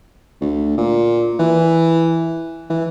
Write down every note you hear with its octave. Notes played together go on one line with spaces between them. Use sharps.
D2
A#2
E3
E3